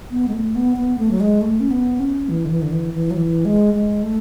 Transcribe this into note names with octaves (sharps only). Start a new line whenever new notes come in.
B3
G#3
A3
B3
B3
A3
F#3
G#3
A3
C#4
B3
C#4
E3
D3
E3
D3
E3
E3
F#3
E3
G#3
G#3
A3